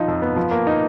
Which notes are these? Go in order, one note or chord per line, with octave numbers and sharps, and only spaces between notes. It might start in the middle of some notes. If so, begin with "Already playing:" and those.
Already playing: F3 D#4
F2
B3
F3
A#3
D#4